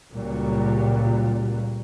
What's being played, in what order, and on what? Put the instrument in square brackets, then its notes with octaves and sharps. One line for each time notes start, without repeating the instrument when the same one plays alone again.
[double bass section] C#2 A#2 F#3 G3